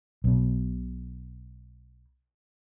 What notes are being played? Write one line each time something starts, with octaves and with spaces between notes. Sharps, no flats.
B1 B2